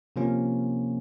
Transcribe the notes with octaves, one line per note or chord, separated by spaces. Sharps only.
C3 F3 A#3 C#4 F4